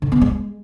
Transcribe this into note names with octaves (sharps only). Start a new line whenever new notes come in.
D3
B3
G#3